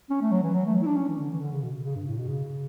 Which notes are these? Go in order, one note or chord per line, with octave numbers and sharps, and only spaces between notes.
C#4
A3
F#3
E3
F#3
A3
F#3
E4
D4
C#4
E3
D3
E3
D3
C#3
B2
C#3
G2
A2
B2
C#3